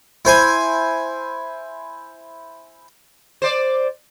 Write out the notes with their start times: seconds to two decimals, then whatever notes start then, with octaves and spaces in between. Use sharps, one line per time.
0.25 E4 C5 G#5
3.42 C5 D5